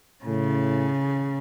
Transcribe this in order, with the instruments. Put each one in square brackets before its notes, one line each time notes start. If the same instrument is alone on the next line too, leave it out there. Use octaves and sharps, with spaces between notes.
[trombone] A2 [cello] C#3